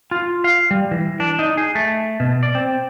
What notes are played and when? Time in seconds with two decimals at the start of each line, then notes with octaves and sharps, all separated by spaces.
0.11 F4
0.44 F5
0.71 G3
0.91 E3
1.20 D4
1.39 D#4
1.57 G#4
1.75 A3
2.20 B2
2.43 D5
2.55 C4